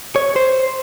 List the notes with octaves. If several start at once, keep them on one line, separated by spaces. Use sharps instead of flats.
C#5
C5